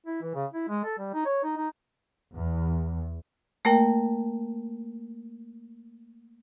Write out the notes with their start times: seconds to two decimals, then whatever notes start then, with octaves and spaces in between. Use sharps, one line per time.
0.06 E4
0.22 E3
0.35 C#3
0.53 E4
0.68 G#3
0.84 A4
0.98 G3
1.14 D#4
1.25 C#5
1.44 D#4
1.56 D#4
2.34 E2
3.65 A3 A#3 A#4 G5